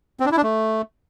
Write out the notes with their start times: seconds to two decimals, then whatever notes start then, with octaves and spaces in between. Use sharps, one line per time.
0.20 C4
0.26 D4
0.32 E4
0.37 D4
0.43 A3